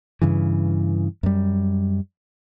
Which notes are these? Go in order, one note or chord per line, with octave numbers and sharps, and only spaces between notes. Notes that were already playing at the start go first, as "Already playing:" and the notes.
G2 C#3 E3
F#2 G3